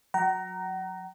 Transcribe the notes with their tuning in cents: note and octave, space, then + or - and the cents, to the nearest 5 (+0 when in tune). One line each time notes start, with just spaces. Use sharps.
F#3 -30 F#5 +40 A#5 +0